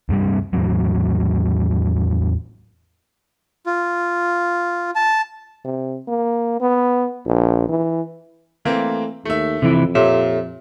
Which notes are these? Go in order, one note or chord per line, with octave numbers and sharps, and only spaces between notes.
D1 G2 C3 G3
E2 A2 E3 F#3
F4
A5
C3
A#3
B3
A#1
E3
E3 A3 A#3 C4
D#2 A3 E5
F2 C3 E3 E4
A#2 G4 A4 C#5 E5